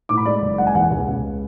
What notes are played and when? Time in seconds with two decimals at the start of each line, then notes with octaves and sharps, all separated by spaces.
0.09 A2 D6
0.17 B5
0.25 G#3 D5
0.42 F#1
0.58 G#3 F#5
0.67 G#5
0.74 E2 F#5
0.90 C#2
1.07 C#2
1.24 G#3